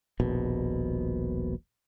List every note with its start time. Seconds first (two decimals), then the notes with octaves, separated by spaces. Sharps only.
0.20 D#1 A#1 B2